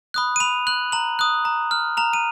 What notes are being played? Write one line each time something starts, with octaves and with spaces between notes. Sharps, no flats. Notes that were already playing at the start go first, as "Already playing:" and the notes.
B5 D#6 F#6
D#7
B5 F7
F#6 F#7
A#5 F#7
D#6 F#6
A#5
F6
A#5 F7
D#7